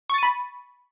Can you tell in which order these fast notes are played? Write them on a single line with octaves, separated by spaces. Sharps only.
C#6 A6 D#7 B5